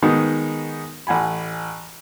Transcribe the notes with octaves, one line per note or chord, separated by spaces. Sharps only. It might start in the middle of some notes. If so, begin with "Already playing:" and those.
D#3 G#3 B3 D#4 F#4
A1 F#5 G#5 B5